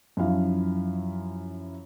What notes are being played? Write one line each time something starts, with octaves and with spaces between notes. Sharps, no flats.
F#2 D#3 F3 E4 F5